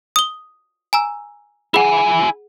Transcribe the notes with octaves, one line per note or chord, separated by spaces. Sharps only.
D#6 G7
G#5 A#5 E6
E4 G#4 F#5 G#5